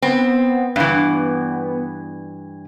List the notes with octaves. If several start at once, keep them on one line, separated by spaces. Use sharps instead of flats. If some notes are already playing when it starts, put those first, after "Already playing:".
B3 C4
G2 E3